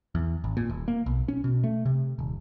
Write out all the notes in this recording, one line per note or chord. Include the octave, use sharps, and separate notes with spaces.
E2
G#1
A#2
D#1
A#3
B1
C#4
B2
A3
C3
D#1